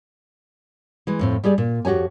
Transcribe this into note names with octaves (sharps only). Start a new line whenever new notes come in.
E3 G#3
F2 A2 C4
G3 G4 G#4 D5
A#2
F2 F#4 G4 C#5 G#5